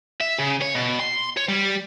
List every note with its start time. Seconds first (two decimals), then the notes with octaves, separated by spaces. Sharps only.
0.21 E5
0.39 C#3
0.62 C#5
0.74 B2
0.99 C6
1.37 C#5
1.49 G3